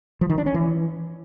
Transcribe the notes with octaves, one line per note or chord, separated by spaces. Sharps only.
F3
D#3
D4
C#4
E3